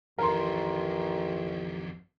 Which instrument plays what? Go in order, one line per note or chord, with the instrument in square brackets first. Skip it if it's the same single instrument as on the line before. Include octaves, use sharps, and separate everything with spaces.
[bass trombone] A1 [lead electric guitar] F2 D#3 [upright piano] A#4 C6